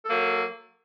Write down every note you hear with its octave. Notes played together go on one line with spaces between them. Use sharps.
F#3 A#3 A4